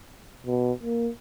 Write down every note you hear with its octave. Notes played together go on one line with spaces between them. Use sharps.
B2
A#3